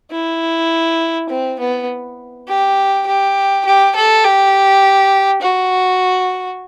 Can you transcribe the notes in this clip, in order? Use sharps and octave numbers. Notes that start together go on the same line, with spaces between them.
E4
C4
B3
G4
G4
G4
A4
G4
F#4